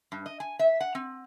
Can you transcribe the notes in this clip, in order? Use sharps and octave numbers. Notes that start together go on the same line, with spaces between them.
G2
D#5
G#5
E5
F#5
C4